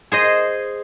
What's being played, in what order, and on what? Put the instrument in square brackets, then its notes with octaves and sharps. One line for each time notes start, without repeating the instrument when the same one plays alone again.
[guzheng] G#4 C5 D#5